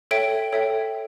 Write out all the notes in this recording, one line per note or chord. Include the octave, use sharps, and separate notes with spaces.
A4 C#5 E5 G5 D7
A4 C#5 E5 G5